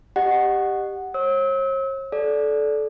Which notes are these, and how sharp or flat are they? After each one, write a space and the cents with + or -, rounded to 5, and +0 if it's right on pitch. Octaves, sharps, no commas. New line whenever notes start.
G4 +5 D#5 -35 F#5 +0
C#5 -45 E6 -40
A4 -20 D5 -10